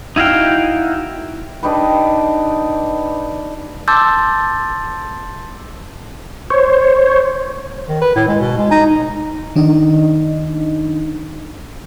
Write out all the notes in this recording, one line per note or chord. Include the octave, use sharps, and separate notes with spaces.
D#4 E4 F#4 F5 G5
D4 D#4 G4 B4
A5 C6 D6 E6 G6 A6
C5 C#5
D#3
B4
A2
G#3
B2
G#3
D#4
D#3 D4 D#4 D#5